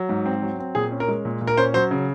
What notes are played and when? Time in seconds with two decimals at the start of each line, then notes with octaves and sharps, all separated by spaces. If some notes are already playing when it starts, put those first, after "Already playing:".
Already playing: F#3
0.09 G#2
0.26 C4
0.42 F#3
0.59 C4
0.75 A#2 G#4
0.91 C#4
1.00 A#4
1.08 G#3
1.25 A#2
1.41 A#2
1.47 A#4
1.57 C#4 C5
1.74 F#3 C5
1.91 C#3